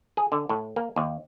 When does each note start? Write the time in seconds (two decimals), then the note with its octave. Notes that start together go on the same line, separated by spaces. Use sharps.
0.17 G#4
0.32 D3
0.49 A2
0.76 A#3
0.96 D#2